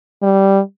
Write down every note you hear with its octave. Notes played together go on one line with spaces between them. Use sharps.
G3